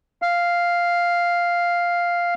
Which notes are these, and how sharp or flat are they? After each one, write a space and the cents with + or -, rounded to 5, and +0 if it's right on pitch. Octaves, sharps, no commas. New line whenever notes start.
F5 +0